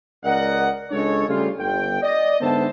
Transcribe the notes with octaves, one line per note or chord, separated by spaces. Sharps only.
C#2 A#4 D5 D#5 F#5
C#2 G#3 D4 A4 C#5
C#3 G3 A3 F4
G1 G5
D5 D#5
G#2 D3 B3 C5 E5 A5